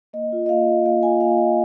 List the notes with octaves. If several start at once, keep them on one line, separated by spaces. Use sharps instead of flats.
A#3 D#5
F4
D#5
A#3 F5
F4
A#3 F5
F4 G#5
A#3 F5
F4 D#5